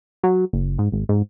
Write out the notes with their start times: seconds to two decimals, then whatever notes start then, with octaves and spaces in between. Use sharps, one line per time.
0.23 F#3
0.53 F#1
0.79 G#2
0.92 G#1
1.09 G#2